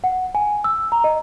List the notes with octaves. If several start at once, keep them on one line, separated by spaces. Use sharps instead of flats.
F#5
G#5
E6
A#5
D#5